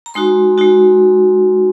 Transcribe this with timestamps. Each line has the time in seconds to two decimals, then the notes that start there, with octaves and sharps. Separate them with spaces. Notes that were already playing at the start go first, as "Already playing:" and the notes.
0.06 A#5
0.14 G#3 D#4 F#4 C6
0.58 G#3 D#4 F#4